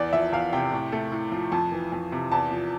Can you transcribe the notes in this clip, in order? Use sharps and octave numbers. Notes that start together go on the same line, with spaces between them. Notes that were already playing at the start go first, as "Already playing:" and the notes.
Already playing: E2 D5
F3 E5
E2 F5
C3 G5
A2
A3
A2
F3
F2 A5
E3
F2
C3
E2 A5
F3